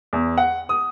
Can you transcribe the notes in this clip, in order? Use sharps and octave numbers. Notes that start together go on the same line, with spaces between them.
E2
F#5
D#6